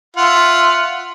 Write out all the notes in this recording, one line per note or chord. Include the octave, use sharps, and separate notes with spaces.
F4 E5 F#5